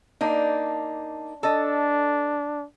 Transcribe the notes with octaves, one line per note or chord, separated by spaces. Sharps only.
A#3 D4 D#4
D4 A4 D#5